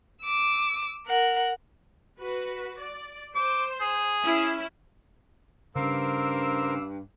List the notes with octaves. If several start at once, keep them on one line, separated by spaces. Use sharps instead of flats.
D6 E6
A#4 F#5
F#4 B4
D5
C5 D6
G#4
C#4 E4 E5
G2 C#3 C#4 A#4 C5 F5 D6 E6